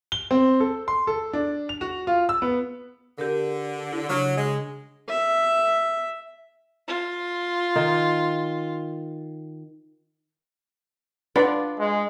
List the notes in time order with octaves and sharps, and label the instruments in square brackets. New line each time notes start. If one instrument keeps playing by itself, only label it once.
[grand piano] G7
C4
A4
C6
A4
D4
F7
F#4
F4
E6
B3
[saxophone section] D3 [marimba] G4 A#4
[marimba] E4
[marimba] C#3 D4 [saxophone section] F#3
[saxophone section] G#3
[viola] E5
[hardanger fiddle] F4
[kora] D#3
[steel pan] D4 D5 F#5 [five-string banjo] F4 B4
[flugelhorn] G#3